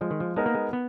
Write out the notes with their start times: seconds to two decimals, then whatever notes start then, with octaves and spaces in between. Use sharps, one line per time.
0.01 F3 G#3
0.11 D#3
0.20 F3
0.36 G#3 B3 D#4 A#4
0.46 A#3
0.55 G#3
0.73 B3